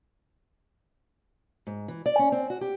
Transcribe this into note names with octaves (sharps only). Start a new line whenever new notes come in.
G#2
E3
D5
C#4
C4
F#4
G4